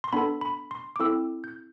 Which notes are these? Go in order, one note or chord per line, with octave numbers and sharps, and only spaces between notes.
C6
B3 D4 A4 B5
B5
C6
D6
C4 E4 A4 E6
G6